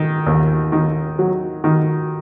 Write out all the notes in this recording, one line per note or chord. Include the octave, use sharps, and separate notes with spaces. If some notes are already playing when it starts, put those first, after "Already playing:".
Already playing: D#3
D#2
D#3
F#3
D#3